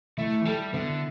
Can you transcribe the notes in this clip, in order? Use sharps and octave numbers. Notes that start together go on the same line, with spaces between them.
A3 E4
E3
G3 A4
D3 B3